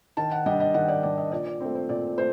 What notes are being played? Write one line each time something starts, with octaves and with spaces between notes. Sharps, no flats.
D#3 A5
F#5
G3 D4 D#5
D#5
D#3 F#5
D5
G3 D4 D5
D#5
A#2 D5
D5
A3 C4
C5
A#2 D5
A3 C5